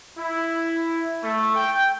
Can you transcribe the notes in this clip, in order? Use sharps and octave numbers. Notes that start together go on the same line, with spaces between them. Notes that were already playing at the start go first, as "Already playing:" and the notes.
E4
A3
G5